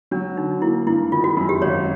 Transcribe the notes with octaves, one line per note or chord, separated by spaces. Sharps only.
F#3 D4
D3 D#4
A#3 E4
G2 E4
D#3 F4
F#4
F#2
G4
G#1 C#5